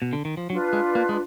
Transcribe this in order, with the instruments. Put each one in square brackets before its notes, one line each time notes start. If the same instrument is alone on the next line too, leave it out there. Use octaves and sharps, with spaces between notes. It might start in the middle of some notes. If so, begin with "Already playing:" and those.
[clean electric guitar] B2
D3
D#3
F3
[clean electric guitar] F#3 [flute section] D4 F4 B4
[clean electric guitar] G#3
A#3
G#3